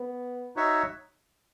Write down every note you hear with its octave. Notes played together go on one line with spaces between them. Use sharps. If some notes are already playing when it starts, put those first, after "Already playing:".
Already playing: B3
D#4 F#4 C#5 E5